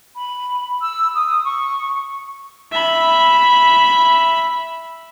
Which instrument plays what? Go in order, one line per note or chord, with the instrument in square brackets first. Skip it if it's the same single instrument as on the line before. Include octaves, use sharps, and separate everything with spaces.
[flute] B5
E6
D#6
C#6
[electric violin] E5 B5